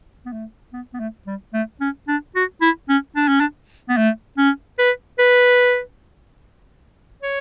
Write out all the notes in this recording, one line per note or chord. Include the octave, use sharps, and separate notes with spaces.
B3
A3
B3
B3
A3
G3
A3
C#4
D4
F#4
E4
C#4
D4
C#4
D4
B3
A3
C#4
B4
B4
C#5